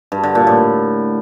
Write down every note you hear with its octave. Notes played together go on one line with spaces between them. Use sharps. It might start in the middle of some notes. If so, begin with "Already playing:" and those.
G2
D3
A#2
A2